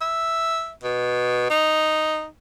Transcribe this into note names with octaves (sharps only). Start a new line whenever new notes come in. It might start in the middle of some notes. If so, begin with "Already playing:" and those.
E5
B2
D#4